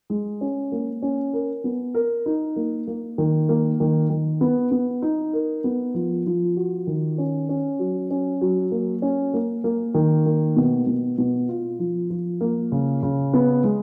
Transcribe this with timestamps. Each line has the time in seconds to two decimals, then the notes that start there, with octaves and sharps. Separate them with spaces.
0.10 G#3
0.41 C#4
0.72 A#3
1.02 C#4
1.33 A#4
1.64 B3
1.94 A#4
2.26 D#4
2.56 A#3
2.87 A#3
3.18 D#3
3.49 A#3
3.80 D#3
4.10 D#3
4.41 B3
4.71 B3
5.02 D#4
5.33 A#4
5.64 B3
5.94 F3
6.26 F3
6.57 F#4
6.87 D#3
7.18 C#4
7.49 C#4
7.79 F#3
8.11 C#4
8.41 F#3
8.72 A#3
9.02 C#4
9.34 A#3
9.64 A#3
9.94 D#3
10.26 A#3
10.56 B2
10.87 B2
11.18 B2
11.49 F4
11.79 F3
12.10 F3
12.41 A#3
12.72 C#3
13.03 C#3
13.33 B3
13.64 G#3